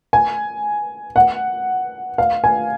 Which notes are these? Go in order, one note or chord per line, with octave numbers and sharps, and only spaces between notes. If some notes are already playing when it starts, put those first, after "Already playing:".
G#5
F#5
F5
G#5